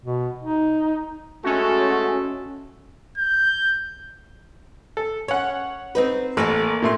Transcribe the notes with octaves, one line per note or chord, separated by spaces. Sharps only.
B2
D#4
G#3 A3 C#4 F#4 A4
G6
A4
C#4 C#5 F#5
C4 D#4 B4
A1 E3 A#3 A4
A#2 A3 C6